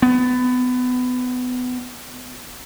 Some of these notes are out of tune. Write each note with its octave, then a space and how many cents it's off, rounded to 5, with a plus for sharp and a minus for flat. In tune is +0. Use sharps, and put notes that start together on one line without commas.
B3 +25